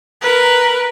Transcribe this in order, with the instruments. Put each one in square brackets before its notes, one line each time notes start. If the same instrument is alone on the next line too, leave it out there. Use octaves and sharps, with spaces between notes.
[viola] A#4 B4